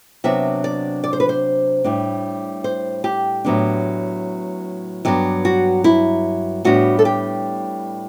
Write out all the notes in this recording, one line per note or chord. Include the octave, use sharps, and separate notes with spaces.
C3 F#3 B3 D4 E5
D5
D5
C5
B4
C5
A2 G3 D4
C5
G4
A2 F#3 B3 D4
G2 F#3 B3 D4 E4
F#4
E4
A2 G3 B3 D4 F#4
A4
G4